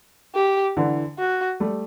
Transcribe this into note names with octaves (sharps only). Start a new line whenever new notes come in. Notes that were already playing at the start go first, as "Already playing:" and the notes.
G4
D3 E3
F#4
G3 A3